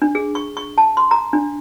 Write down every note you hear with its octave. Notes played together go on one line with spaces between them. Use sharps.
D4
G#4
C#6
C#6
A5
C6
A#5
D4